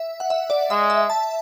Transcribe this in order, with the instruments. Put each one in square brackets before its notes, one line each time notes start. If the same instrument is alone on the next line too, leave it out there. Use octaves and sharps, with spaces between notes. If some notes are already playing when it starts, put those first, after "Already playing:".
Already playing: [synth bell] E5
F#5
E5
D5
[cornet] G#3 [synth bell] E5
[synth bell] E5
A5